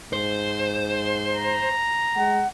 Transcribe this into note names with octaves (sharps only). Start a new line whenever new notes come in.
G#2 C5
A#5
G#3 F#5